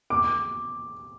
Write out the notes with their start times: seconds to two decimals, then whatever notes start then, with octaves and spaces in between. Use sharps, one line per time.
0.10 D6